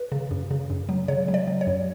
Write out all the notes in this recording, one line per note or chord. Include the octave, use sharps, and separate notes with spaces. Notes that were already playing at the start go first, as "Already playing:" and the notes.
Already playing: B4
C#3
F#2
C#3
F#2
F#3
C#3 C#5
F#3
D5
F#3
C#5
F#2